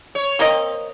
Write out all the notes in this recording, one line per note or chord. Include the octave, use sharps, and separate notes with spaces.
C#5
A#3 C4 A#4 D#5